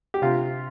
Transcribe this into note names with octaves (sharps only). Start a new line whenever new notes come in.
G4
C3 F4